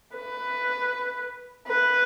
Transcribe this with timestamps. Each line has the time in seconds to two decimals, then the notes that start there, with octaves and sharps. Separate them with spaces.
0.15 B4
1.68 B4